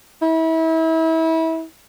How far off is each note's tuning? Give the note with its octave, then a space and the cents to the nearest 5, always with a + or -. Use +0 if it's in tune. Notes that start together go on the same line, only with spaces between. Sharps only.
E4 -30